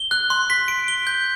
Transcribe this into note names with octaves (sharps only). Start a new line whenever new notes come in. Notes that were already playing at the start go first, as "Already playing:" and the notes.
Already playing: G7
F#6
C6
B6
D7
G7
G6